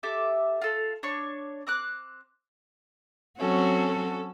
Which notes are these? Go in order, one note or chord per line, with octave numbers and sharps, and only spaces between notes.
G4 A4 E5 D6
F4 A4 F5
D4 C#5 C#6
C4 D6 F#6
F#3 C4 C#4 F#4 A4